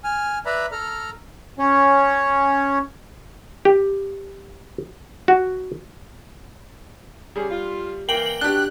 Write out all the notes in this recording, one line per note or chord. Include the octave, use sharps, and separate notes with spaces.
G#5 F6
B4 D5 E5 A#5 B5
A4 A#5 F6
C#4 C#5
G4
F#4
G3 C#4 G4 G#4
F4
E3 A#3 G5 F#7 G7
B2 D4 G4 F#6